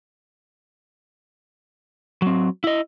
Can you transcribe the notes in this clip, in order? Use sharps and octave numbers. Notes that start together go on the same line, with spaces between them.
F#3 C4
E4 D#5